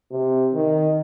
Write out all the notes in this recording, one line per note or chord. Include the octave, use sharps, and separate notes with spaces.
C3
D#3